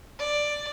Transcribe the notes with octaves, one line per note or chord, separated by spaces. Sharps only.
D5